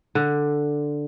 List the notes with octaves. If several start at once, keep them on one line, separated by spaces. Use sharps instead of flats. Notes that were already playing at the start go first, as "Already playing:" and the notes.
D3